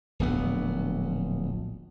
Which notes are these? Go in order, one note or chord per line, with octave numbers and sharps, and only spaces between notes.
D1 A#1 B3